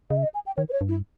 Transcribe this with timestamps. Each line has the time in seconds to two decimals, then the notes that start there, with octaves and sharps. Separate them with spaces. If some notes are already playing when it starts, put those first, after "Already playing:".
0.10 C#3 D#5
0.17 E5
0.23 D#5
0.34 G#5
0.46 G5
0.57 D#3 C#5
0.69 B4
0.72 C#5
0.81 G2
0.88 E4